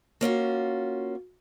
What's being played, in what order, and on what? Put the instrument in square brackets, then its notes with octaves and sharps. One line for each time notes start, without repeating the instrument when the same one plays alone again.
[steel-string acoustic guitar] A#3 C#4 F4 F#4